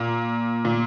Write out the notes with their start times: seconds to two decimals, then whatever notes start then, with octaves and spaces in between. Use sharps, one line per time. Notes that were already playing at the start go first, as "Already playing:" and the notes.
Already playing: A#2
0.65 A#2